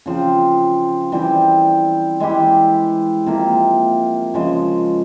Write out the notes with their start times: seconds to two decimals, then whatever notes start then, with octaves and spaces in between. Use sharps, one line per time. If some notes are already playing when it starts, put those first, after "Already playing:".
0.06 C#3 F3 C4
1.12 E3 G3 C4 E4
2.20 E3 G#3 E4 G4
3.26 C3 F3 A#3
4.34 C#3 F3 G#3